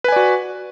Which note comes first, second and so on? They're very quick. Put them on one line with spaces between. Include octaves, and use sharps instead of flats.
B4 G#5 D5 F#4